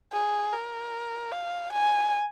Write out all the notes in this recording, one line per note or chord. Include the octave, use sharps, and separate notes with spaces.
G#4
A#4
F5
G#5